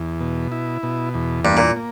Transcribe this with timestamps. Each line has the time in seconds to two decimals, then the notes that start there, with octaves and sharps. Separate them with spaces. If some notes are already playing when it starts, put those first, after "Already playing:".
Already playing: E2
0.20 B2
0.52 E4
0.83 B2
1.14 E2
1.44 G2 A#3
1.57 A#2
1.76 A#3